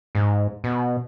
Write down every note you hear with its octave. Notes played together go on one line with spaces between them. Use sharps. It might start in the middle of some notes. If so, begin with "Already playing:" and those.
G#2
B2